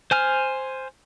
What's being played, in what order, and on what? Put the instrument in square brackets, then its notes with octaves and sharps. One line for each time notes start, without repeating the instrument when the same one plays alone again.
[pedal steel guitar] C5 G#5 F6